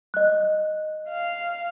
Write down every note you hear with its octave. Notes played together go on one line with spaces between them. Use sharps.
D#5 F#6
F5